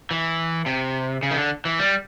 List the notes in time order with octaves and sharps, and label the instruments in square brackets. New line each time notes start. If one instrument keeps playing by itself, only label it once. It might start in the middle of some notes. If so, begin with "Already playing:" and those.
[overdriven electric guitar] E3
C3
C#3
D#3
D3
E3
G3